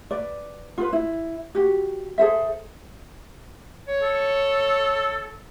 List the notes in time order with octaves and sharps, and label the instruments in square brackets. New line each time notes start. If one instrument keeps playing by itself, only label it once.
[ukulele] B4 D5
F4 G#4 B4
E4
F#4 G4
G#4 A4 C5 E5
[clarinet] C#5
[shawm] A4